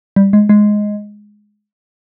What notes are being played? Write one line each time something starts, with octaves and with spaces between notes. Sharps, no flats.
G3
G#3
G#3